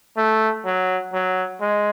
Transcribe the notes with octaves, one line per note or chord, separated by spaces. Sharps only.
A3
F#3
F#3
G#3